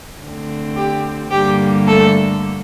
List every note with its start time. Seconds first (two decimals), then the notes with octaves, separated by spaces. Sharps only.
0.20 D3 A3 C4
0.75 G4
1.30 G2 D3 G3 A#3 G4
1.87 A3 A4